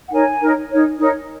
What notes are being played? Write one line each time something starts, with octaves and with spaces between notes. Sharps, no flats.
F#5
D#4 A#4 C#5 G#5
D#4 A#4 C#5
D#4 A#4 C#5
D#4 A#4 C#5